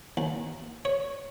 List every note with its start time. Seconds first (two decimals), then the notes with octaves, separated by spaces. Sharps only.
0.17 D#2
0.85 C#5